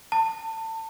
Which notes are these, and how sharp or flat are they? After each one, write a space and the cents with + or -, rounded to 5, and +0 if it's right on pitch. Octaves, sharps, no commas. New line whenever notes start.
A5 +30